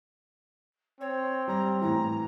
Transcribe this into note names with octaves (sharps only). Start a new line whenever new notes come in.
C4 C#5
G3 A#5
A2 E3 A#5